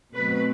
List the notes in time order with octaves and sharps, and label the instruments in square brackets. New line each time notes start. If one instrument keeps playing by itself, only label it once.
[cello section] B2 F#3 A3 C4 B4